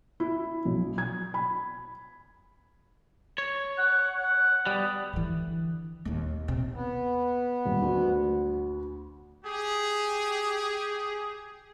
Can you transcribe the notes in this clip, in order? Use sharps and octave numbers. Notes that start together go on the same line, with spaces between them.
E4
B1
G#6
B5
C#5
F#5
F#5
G3 B3
D3 E3
D#2 A#3
C3
B3
D#1
D2
G4 G#4